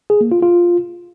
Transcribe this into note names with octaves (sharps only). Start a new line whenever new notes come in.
G#4
A#3
F4
F4